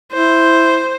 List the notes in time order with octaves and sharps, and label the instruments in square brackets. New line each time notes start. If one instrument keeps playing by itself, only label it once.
[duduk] E4 [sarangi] C5